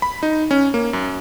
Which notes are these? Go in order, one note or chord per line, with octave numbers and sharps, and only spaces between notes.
B5
D#4
C#4
A#3
F#2